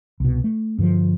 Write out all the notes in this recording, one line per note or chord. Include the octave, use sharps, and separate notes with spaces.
C2 B2
A3
G2 D3 E3 F3